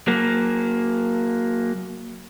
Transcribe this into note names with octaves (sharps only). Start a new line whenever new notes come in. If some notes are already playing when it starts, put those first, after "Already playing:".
F#3 A#3